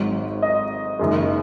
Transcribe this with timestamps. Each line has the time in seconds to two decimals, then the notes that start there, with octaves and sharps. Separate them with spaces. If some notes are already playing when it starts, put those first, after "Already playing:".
Already playing: G#1 G#2 F#3
0.42 D#5
0.99 F#1 F#2 D#3 G#3